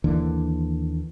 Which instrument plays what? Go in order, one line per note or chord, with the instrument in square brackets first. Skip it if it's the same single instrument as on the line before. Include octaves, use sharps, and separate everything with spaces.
[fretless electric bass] D#2 D3 E3 A#3